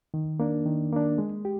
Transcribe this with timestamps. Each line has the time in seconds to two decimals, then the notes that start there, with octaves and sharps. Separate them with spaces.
0.14 D#3
0.40 A#3 D4
0.66 D#3
0.93 A#3 D4
1.18 G#3
1.45 G4